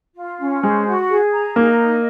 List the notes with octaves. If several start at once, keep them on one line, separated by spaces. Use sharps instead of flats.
F4
C#4
G#3 C5
F#4
G#4
A#5
A#3 D#4
D#5